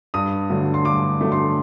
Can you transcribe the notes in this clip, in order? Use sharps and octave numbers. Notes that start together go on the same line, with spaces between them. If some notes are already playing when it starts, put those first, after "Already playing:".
G2 D#6
D3 F#3 A3
C6
G2 D6
D3 F#3 A3
C6